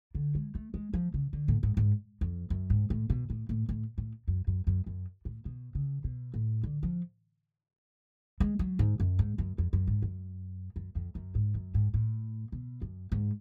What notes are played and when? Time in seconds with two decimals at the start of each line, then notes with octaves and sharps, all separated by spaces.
0.15 D3
0.35 G#3
0.55 A3
0.74 G#3
0.94 F3
1.14 C#3
1.33 D3
1.48 A2
1.63 G#2
1.77 G#2
2.21 F2
2.50 F#2
2.70 G#2
2.90 A2
3.10 B2
3.30 A2
3.49 A2
3.69 A2
3.98 A2
4.28 F#2
4.47 F#2
4.67 F#2
4.86 F#2
5.25 A2
5.45 B2
5.75 C#3
6.04 B2
6.34 A2
6.63 D3
6.83 F3
8.40 G#3
8.59 F#3
8.79 G#2
9.00 F#2
9.19 G#2
9.38 F#2
9.58 F2
9.73 F#2
9.87 G#2
10.02 F#2
10.76 F#2
10.95 F2
11.15 F#2
11.35 G#2
11.55 F#2
11.74 G#2
11.94 A2
12.52 B2
12.82 F#2
13.12 G#2